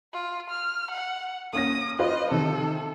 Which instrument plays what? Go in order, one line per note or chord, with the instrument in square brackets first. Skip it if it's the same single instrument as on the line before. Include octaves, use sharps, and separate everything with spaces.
[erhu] F4
F6
F#5
[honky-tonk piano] A#3 C#4 A#6 [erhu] D#6
[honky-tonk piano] F4 B4 C5 [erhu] D#5
[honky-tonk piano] C3 D#3 [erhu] A4